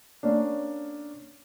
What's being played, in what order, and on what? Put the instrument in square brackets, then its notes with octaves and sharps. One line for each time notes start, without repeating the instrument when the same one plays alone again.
[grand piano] A#3 C#4 D4